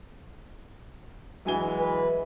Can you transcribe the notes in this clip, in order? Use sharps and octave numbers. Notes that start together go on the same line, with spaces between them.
E3 F#3 G#3 G#5 G7
B4